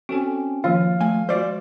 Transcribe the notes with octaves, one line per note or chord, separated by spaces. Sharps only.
C4 C#4 F#4 A4 G#5
D#3 F3 A#3 F4 F5
A3 G#5
G#3 F4 F#4 C5 D5